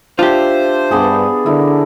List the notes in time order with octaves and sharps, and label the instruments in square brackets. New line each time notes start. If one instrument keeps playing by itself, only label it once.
[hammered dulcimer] D4 E5 [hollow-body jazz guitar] F4 G4 [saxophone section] C5
[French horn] G2 [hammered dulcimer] B3 D4 G#4
[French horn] D3 [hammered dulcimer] E4 A#4